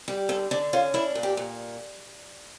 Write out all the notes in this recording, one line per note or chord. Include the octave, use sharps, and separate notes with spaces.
G3 G4
D3 A4
D3 D4
C#4 F4
D4 E4
A#2
G4
A#2